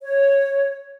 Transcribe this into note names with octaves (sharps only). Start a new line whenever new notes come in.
C#5